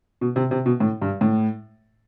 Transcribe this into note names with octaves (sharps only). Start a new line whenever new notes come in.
B2
C3
C3
B2
A2
G2
A2